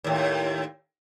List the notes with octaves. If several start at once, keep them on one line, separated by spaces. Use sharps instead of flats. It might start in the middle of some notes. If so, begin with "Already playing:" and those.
D#2 A2